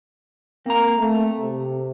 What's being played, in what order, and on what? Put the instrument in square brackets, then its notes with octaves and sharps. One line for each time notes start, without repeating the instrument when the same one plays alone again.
[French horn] A#3 [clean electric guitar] C4 A#5
[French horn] A3
C3